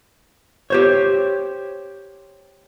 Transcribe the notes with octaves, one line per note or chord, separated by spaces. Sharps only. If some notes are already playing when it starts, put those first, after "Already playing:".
G4 C5 C#5